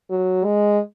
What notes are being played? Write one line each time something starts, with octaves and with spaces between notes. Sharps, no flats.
F#3
G#3